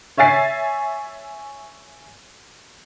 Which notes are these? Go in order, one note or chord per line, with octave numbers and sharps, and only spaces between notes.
C#5 E5 G#5 A6 C7